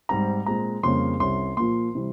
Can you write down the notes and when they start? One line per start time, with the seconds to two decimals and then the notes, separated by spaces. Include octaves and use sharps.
0.09 G#2 G3 C4 A#5
0.46 A#2 G#3 C4 A#5
0.83 F2 C#3 G3 A#3 C#4 C6
1.20 C2 C3 G3 C#4 C6
1.57 A#2 F3 A#3 C6
1.95 C3 E3 G3